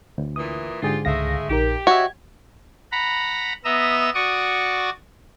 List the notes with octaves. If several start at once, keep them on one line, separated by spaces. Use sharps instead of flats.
D2
A#2 E3 D#6
G#2 D3 F4 G4 G#4
C#2 G#3 A3 E5 F5 A#6
A#1 D#4 G4 A#4
F#4 C#5 D#5 E5 G#6
F#5 A#5 B5
B3 D#5 E5 A#5 E6
F#4 D5 C#6 D#6